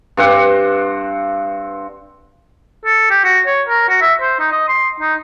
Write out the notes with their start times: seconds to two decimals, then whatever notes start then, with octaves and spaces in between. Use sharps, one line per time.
0.17 G2 C4 F#5
2.85 A4
3.10 G4
3.24 F#4
3.46 C#5
3.68 A#4
3.89 F#4
4.01 E5
4.21 C5
4.39 D#4
4.52 D#5
4.68 C6
5.00 D#4